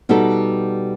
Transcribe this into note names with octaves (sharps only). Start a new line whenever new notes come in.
B2 G3 B3 D#4 F#4 A4